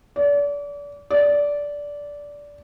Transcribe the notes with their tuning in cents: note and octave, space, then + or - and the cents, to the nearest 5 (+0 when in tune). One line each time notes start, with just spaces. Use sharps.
D5 -35
D5 -15